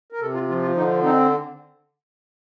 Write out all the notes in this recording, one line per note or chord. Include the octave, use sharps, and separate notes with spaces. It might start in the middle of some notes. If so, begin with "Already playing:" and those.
A#4
C3 A4
F4
F3 F4
F4
D3 D#4
C4 D#4